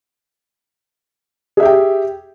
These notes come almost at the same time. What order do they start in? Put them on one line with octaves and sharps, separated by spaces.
G#4 E5 G4 G5